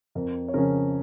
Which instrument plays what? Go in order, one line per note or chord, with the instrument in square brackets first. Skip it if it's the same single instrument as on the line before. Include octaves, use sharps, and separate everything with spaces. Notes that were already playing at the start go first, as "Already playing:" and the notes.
[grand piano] F2 A#4
C#5
C#3 F3 C#4 A#4